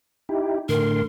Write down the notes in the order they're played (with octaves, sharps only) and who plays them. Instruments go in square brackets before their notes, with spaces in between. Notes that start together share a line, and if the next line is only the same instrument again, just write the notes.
[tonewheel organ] D#4 E4 G4
[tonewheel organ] A2 D3 C6 [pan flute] A#4